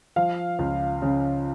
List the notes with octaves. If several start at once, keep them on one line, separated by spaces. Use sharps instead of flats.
F3 F5
C#2
C#3